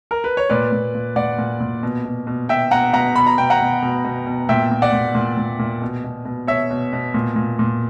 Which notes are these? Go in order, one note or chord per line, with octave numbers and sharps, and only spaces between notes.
A#4
B4
C#5
A#2 B4 D5
A#2
A#2
A#2 D5 F#5
A#2
A#2
B2
B2
B2
B2 E5 G5
B2 F#5 A#5
B2 F#5 A#5
B2 B5
A#5
B2 G5
F#5 A#5
B2
B2
B2
B2
A#2 E5 G5
A#2
D5 F#5
A#2
A#2
A#2
A#2
B2
B2
B2
B2 C#5 E5
B2
B2
A#2
A#2
A#2